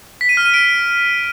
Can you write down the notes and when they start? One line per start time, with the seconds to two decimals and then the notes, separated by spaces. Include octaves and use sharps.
0.21 B6
0.29 D#7
0.37 F6
0.45 D#7
0.54 D7